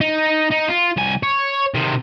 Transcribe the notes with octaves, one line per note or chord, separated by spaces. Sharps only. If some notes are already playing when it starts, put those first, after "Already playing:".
D#4
D#4
F4
C2 G#5
C#5
C3 D#3